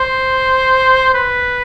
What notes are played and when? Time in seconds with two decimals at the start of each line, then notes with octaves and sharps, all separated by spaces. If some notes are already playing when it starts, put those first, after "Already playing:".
Already playing: C5
1.14 B4